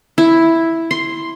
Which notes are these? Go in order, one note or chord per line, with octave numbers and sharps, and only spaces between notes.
E4
C6